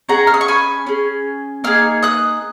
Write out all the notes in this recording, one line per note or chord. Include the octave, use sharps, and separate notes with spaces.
C#4 G#4 F#5 A#5
F6
D#6
C#6
G#5 B5
C#4 G#4
A#3 D#4 G#4 F6
D#6 F#6